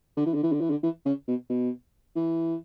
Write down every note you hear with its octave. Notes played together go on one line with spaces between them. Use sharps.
D3
E3
D3
E3
D3
E3
D3
E3
C#3
B2
B2
E3